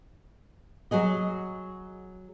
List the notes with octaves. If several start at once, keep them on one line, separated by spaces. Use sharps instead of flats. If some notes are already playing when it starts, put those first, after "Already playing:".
F#3 F#4 G#4 D#5